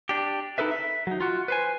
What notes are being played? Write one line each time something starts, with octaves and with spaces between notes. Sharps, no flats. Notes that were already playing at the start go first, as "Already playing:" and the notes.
D4 G4
D#4 E4 A4 B4 E5
E5
F#3 D#4
F4 F#4
B4 C5 G#5